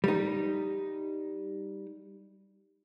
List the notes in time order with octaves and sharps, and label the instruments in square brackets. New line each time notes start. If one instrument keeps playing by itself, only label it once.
[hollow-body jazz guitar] G3 D#4